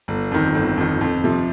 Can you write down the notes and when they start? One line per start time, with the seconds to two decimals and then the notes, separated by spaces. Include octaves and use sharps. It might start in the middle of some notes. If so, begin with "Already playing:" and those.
0.08 G1
0.31 F2 D#3
0.55 G1
0.77 F2 D#3
1.01 F2
1.24 C3 F3